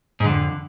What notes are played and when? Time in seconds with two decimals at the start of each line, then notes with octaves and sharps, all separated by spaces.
0.20 G#2
0.24 D3
0.28 F2